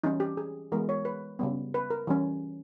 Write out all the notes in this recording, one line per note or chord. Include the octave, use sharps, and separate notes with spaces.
E3 G3 C#4 D#4
G4
G#4
E3 G#3 B3 A#4
C#5
B4
C#3 G3 B3
B4
A#4
E3 G3 C#4